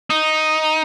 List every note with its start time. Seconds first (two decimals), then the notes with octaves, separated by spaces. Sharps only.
0.10 D#4